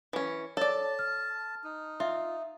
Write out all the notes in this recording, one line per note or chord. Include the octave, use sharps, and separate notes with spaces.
E3 C#4
A4 C#5 D5 A5
F6
D#4
F4 E5